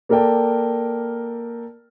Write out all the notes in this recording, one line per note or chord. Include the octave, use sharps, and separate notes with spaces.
A#3 A4 A#4 D5 G5 A5